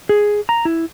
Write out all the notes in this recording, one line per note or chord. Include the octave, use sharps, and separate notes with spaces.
G#4
A#5
E4